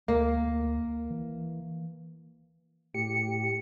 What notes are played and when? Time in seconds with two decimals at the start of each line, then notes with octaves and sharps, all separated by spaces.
0.08 D2 A#3
1.10 E3
2.94 A2 G4 C#7